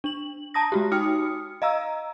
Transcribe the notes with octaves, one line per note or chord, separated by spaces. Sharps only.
D4 F#7
A5 A#5 D#6 A#6
G#3 F#4 G4
D#4 F#4 G5 D#6 F6 C#7
D#5 F5 A#5 E6